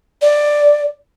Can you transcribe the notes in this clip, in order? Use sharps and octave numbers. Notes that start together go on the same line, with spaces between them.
D5